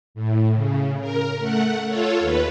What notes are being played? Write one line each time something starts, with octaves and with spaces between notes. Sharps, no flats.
A2
C#3
A#4
A3 F#5
F4 A4 C#5
D#2 B4